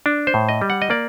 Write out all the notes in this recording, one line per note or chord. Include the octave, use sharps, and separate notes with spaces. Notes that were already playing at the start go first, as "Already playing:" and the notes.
D4
C5
A2
D#5
G3
F#5
D#5
A#3 D5